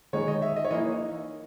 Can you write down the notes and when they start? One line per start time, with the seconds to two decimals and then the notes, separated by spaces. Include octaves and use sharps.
0.13 D#3 G#3 D#4 C#5
0.28 D#5
0.42 E5
0.56 D#5
0.64 C#5
0.70 E3 A#3 D#4 D#5